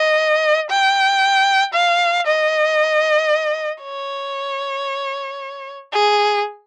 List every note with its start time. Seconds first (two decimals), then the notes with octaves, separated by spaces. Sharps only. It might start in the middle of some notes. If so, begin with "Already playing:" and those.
Already playing: D#5
0.70 G5
1.74 F5
2.27 D#5
3.83 C#5
5.92 G#4